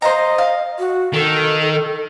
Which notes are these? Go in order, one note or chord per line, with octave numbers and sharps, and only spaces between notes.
C5 D#5 F5 A#5
F5
F#4
D#3 A4